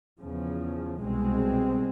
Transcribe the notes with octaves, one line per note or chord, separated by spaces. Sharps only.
E2 C#3 F3
C2 B2 G#3 C4